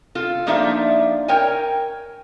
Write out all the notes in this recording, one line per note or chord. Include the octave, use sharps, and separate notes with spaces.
F4 A4
F3 A#3 D4 D#4 F4 E5
A#4 C#5 G5 G#5